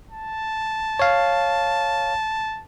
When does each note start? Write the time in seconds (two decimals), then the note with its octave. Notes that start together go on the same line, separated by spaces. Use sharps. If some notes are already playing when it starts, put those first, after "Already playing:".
0.11 A5
0.99 C#5 F5